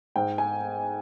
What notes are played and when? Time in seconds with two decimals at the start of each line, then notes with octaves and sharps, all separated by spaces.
0.16 G#2 G5
0.38 G#5